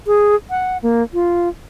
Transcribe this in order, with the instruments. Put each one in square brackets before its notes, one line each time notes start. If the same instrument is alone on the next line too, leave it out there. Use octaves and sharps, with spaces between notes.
[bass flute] G#4
F#5
A#3
F4